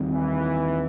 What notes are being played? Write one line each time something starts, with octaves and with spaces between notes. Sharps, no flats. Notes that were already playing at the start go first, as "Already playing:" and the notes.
Already playing: D#2 D#3 G3 C4
E3